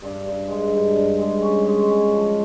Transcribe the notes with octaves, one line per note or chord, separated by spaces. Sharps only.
G2
G2
G#3
G2
G2
G#3
C#4
G#3
C#4
F3